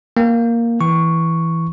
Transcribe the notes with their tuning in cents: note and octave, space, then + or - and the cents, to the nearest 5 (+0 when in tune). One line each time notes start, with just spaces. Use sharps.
A#3 +0 G5 +0
E3 +0 C#6 +0